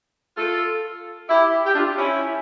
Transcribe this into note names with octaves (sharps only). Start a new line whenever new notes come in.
F4 A4
E4 G4
G4
D4 F4
C#4 E4